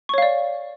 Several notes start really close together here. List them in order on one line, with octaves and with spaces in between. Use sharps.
C#6 C#5 F5 D5